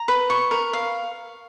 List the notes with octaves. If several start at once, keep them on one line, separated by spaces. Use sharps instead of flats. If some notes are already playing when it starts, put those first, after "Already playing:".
Already playing: A#5
B4
C#6
A#4
F5